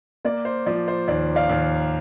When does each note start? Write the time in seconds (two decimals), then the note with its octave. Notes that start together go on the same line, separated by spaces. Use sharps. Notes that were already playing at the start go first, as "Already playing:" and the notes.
0.25 A#3 D5
0.45 C5
0.66 F3 D5
0.88 C5
1.08 D#2 D5
1.36 D5 F5
1.50 D#2